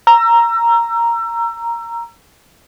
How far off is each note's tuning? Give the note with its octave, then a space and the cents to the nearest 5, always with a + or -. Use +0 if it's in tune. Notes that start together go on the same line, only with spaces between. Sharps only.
A#5 +0 E6 +30